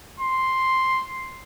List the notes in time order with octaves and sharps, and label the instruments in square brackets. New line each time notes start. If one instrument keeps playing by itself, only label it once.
[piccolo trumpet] C6